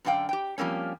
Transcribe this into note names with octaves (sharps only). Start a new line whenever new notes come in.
F#2 D3 D5 F5 G5
G4 G5
F3 G3 A#3 C4 C#4